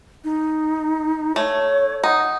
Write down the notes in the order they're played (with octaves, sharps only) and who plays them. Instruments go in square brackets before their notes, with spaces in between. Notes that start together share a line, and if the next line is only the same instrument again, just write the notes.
[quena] D#4
[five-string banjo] A3 [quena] C#5
[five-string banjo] D#4 [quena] F#5